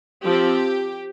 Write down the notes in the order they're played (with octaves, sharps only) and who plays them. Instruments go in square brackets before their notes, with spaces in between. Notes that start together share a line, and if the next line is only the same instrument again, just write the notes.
[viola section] F3 C4 G4